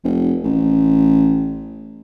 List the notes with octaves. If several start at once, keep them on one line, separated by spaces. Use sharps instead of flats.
F1
A1